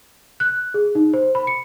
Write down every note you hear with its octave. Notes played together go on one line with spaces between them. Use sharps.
F#6
G#4
D#4
C5
B5
C#7